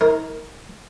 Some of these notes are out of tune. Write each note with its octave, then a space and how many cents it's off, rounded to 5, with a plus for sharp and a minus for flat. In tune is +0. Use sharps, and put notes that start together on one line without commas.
D#4 +45 A#4 +0